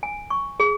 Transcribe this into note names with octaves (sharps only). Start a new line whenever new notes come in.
G#5
C#6
G#4